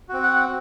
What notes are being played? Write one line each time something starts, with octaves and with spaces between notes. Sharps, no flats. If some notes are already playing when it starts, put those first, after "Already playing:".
C4 F#4
F#5